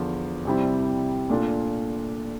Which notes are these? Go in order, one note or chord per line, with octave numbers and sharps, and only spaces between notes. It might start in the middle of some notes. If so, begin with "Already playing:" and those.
Already playing: E2 D3 F3
C2 C3 G3 C4 E4
A#2 A3 D4 F4